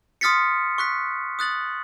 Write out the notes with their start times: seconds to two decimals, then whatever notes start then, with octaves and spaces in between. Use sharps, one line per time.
0.21 C6 D#6 F6 A6 B6 C#7
0.78 C#6 F#6 B6
1.39 D#6 F#6 A6 F#7